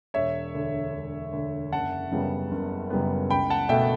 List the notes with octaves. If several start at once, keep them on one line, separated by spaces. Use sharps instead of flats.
E1 C#5 E5
D2 D3
E1
D2 D3
F#1 F#5 A5
F#2 C#3 G3 B3
F#1
F#2 C#3 G3 B3
C#2 G5 B5
F#5 A5
B2 A3 E5 G5